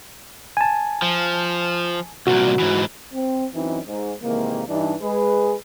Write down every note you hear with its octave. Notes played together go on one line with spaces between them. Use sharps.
G#5 A5
F3
C2 A#2 F#4
G#2 E3
C4
F#2 E3 C4 D#4
G#2
C3 D#3 E3 G#3 A#3
G2 E3 D4 D#4
G#3 G#4 B4